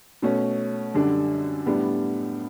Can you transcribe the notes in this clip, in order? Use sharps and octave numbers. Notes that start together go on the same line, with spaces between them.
B2 A3 C#4
F#2 D3 G3 D4
A2 G3 B3 D4